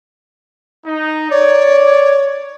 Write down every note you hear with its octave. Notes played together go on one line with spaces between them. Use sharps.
D#4
C#5 D5